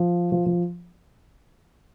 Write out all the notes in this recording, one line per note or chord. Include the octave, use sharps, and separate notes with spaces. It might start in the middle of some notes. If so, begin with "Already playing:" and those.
Already playing: F3
F3
F3